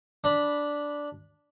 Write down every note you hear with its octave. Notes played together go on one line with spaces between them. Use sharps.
D4 B5